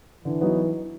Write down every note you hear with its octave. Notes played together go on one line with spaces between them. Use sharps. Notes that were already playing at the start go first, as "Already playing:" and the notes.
D3 E3
F#3 B3 D#4